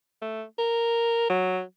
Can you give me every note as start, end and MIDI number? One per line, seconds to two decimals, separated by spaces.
0.22 0.44 57
0.58 1.26 70
1.30 1.62 54